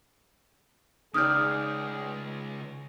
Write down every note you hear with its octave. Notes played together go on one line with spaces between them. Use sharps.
C#2 D#4 G#4 D5 D#6 F6 G6